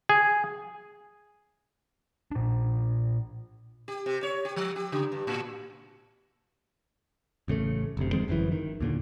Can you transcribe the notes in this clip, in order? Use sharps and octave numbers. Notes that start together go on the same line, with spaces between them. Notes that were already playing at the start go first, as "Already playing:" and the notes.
G#4
A#2 D4
G4
C3
C#5
G4
F3
G4
C#3
G2
A2
A1 C#3 G#3 A3
F#1 D2 C3
D#3 F3 G#3 C4
G1 F#2 A#2 E3
D#3
D#2 A#2 D3